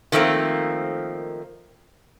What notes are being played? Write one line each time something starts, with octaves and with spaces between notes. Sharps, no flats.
D#3 F3 A3 A#3 C4